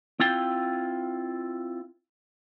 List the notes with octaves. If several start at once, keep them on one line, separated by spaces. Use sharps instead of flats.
C4 E4 F4 G5